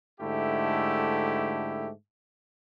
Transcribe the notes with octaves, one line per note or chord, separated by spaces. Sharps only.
G#2 D3 A3 E4 G4